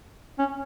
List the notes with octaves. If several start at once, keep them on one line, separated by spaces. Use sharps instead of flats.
C#4